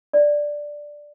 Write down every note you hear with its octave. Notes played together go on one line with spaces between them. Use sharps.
D5